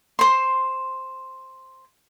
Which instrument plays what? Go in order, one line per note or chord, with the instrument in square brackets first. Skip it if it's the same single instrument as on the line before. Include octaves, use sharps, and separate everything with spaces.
[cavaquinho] C5 C6